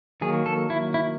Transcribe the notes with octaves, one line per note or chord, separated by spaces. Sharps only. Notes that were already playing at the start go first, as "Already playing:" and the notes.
D#3 F#3 A#3 G#4
A4
E4
E4